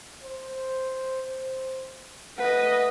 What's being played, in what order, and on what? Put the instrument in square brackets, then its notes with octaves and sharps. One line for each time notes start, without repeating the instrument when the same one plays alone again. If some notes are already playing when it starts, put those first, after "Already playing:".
[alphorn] C5
[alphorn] A3 [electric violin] B4 D#5 [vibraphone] F#5